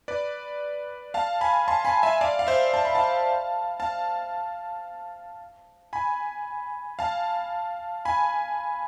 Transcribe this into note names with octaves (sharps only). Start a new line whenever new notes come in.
B4 D5
F5 A5
G#5 B5
A5 C6
G#5 B5
E5 G#5
D5 F5
F5
C5 E5
A5
B5
F5 A5
F5 A5
G#5 B5
F5 A5
G#5 B5